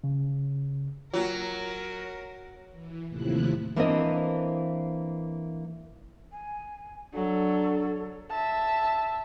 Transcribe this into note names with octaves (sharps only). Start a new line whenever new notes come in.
C#3
F#3 A#3 F4 A#4
E3
D#2 A2 C3 F3 E4 F#6
E3 A#3 C4 D4 B4 D#5
G#5
F#3 D4 A4
E5 A5